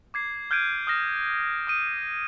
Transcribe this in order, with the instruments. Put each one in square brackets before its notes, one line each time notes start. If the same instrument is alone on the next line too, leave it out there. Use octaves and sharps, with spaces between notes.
[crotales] D6 G#6 C7
F6 G6 G#6 D7 D#7
D#6 F6 A#6 E7
D#6 F6 D#7